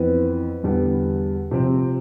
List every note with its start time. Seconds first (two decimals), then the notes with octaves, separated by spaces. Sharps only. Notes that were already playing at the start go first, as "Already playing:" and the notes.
Already playing: F2 E3 B3 B4
0.63 E2 D3 G3 B3
1.51 C3 F3 C4